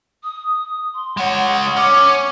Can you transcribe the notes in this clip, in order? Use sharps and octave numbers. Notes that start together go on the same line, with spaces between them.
D#6
C6
G#3 C#5 F#5
C#4 C#5 D6